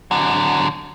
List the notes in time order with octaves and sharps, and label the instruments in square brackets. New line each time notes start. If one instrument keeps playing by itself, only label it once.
[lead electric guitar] D3 F#3